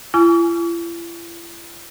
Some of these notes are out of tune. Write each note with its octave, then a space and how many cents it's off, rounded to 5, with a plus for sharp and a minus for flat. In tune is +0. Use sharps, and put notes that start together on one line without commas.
E4 +45 G#5 +15 C#6 +45